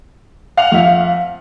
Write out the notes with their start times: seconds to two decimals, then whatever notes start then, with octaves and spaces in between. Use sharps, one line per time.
0.57 F5 F#5 F7
0.72 F2 E5